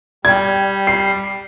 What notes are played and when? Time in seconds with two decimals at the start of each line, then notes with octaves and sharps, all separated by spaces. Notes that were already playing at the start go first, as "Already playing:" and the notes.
0.25 G3 D5 G5 G#6
0.87 C7